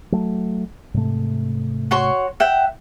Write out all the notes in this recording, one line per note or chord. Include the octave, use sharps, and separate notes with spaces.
F#3 A3
G#2 C3 A3
F#4 C#5 C6
E5 F#5 G5